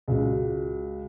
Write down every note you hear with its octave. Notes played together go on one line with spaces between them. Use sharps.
C#2 F#4